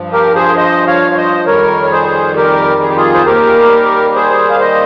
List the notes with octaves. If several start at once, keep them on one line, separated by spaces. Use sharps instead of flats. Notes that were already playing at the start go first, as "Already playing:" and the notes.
Already playing: G2 F3
G4 A#4
G#4 C5
C5 D#5
C#5 F5
C#5
C5 D#5
F2 D#3 G3 A#4 C#5
C#5
G#4 C5
G4 A#4
G#4
G4
F4 G#4
C5
D#2 D#3 G3 G4 A#4
G#4 C5
F5
C5 D#5